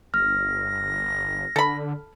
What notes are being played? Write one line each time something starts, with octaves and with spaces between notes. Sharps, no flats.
G1 F6 A#6
D3 A4 B5